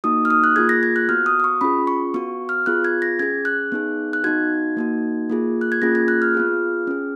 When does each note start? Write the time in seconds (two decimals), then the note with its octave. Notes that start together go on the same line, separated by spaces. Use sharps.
0.04 A#3 D#4 F#4 D#6
0.25 F6
0.30 D#6
0.44 F#6
0.56 A#3 F4 G#4 G#6
0.69 A#6
0.83 G#6
0.96 F#6
1.09 B3 F#4 F6
1.26 D#6
1.40 D#6
1.44 C#6
1.61 C#4 F4 G#4 B5
1.87 C#6
2.14 B3 F#4 C#6
2.49 F6
2.66 B3 F4 G#4 F#6
2.84 G#6
3.02 A#6
3.19 C#4 G#4 G#6
3.45 F#6
3.72 B3 D#4 G#4
4.13 F#6
4.24 B3 D#4 F#4 G#6
4.77 A#3 D#4 F#4
5.30 A#3 F4 G#4
5.61 F#6
5.72 G#6
5.82 A#3 C#4 F4 G#4 A#6
5.95 G#6
6.08 F#6
6.22 F6
6.35 B3 F4 G#4
6.87 C#4 G#4